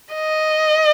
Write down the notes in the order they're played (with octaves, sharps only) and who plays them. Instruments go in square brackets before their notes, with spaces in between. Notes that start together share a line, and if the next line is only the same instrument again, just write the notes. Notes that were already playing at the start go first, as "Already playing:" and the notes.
[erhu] D#5